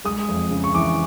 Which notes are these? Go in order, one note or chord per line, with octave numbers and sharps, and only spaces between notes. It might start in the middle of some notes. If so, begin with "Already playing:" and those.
G#3 D#6
F2
C#3
C#6
E3 D6